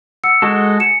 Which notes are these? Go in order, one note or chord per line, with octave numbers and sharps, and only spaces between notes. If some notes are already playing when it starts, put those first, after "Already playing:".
F#5 E6 C#7
G#3 F#4 A4 C#6
G#5 C#7 E7